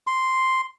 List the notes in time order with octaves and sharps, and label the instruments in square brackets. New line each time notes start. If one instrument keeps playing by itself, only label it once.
[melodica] C6